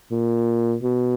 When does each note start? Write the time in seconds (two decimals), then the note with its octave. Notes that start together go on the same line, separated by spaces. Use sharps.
0.11 A#2
0.83 B2